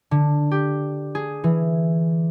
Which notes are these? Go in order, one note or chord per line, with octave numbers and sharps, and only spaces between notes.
D3
G4
G#4
E3